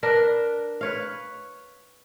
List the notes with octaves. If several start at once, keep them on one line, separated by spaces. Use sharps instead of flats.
D4 A#4 B4
B4 C#5 F5